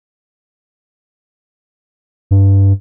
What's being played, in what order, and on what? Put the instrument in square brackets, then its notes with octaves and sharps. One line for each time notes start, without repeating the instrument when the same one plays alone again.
[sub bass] G2